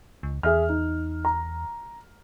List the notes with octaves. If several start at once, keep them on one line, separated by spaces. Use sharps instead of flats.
C#2
E2 G#4 E5 F6
D#4
A#5